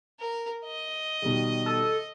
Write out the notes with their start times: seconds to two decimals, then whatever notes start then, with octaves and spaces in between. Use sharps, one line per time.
0.19 A#4
0.66 D#5
1.22 B2 D#3 G3
1.66 A4